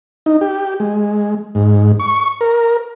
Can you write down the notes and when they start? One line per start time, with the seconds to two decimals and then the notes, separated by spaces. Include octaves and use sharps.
0.26 D#4
0.41 G4
0.80 G#3
1.55 G#2
2.00 C#6
2.41 A#4